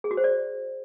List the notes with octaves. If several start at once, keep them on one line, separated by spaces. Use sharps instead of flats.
G#4
F#4
C5
D5